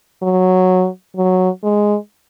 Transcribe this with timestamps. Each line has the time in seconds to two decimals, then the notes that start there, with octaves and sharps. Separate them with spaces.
0.22 F#3
1.16 F#3
1.63 G#3